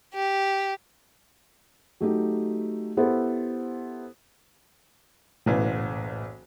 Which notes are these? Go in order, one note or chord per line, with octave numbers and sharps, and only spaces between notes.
G4
F#3 A3 D#4 G4
B3 E4 G4 A4 C5
F#1 B1 A2 E3